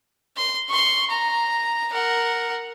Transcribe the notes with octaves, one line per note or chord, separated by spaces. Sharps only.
C6
C6 C#6
A#5
A#4 F#5